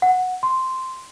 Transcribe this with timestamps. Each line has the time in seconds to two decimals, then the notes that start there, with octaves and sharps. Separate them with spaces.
0.02 F#5
0.43 C6